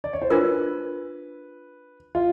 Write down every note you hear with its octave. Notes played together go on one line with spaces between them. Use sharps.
D5
C#5
C5
D4 F4 A#4 B4
F4